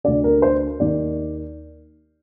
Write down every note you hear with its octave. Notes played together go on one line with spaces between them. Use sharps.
D2 D3 D5
A#4
C5
D#2 D#3 D5